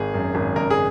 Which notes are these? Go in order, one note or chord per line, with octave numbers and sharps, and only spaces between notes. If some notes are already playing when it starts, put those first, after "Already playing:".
Already playing: G#1 G#4
F#2
G#1
F#1 A#4
G#4